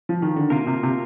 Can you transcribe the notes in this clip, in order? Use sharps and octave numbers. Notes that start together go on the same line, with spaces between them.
F3
D#3
D3
C3 A#3 F4 A#4
C3
C3